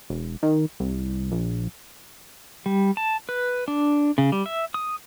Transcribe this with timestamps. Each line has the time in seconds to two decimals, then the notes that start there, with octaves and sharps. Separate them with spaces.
0.10 E1
0.43 D#3
0.80 C2
1.31 A#1
2.66 G3
2.97 A5
3.29 B4
3.68 D4
4.18 C#3
4.32 G3
4.46 E5
4.74 D#6